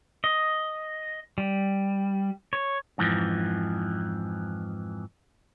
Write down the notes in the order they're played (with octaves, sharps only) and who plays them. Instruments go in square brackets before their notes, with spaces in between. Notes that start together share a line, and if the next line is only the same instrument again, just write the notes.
[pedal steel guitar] D#5
G3
C#5
[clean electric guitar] F2 G#2 E3 F3